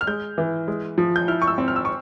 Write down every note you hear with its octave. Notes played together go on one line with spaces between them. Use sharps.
F6
G#3 G6
E3
G#3
F3
G6
E4 F6
C#6
E6
C4
F6
E6
C#6